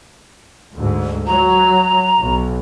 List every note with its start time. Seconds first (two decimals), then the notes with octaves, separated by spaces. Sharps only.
0.77 D2 G#2
1.27 F#3 A#5
2.20 B1